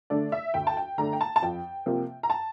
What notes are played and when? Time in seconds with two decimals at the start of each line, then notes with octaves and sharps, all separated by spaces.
0.10 D3 A3 D4 D5
0.32 E5
0.54 D2 G5
0.67 A5
0.77 G5
0.98 D3 A3 D4 A#5
1.13 G5
1.21 A5
1.36 A5
1.42 F2 G5
1.86 C3 F3 A#3
2.23 A#5
2.30 A5